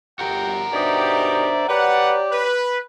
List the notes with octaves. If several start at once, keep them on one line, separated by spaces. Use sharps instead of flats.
G1 F#4 G4 A#4 G5
B2 D4 D#4 G4 C5 D5 E5
G4 B4 C#5 D5 F#5
B4